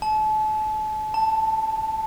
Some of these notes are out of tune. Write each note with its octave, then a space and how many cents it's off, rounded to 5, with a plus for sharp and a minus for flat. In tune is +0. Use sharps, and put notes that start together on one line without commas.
A5 -35
A5 +5